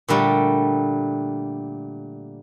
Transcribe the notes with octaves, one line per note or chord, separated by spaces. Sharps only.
A#2 D3 G3 A3